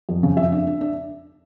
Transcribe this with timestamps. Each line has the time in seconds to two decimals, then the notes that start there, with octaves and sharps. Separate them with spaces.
0.09 F2
0.23 C#3
0.37 F2 E5
0.52 D4
0.67 D4
0.81 D4